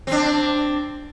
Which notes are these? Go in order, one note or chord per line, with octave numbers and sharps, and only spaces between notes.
C4 D4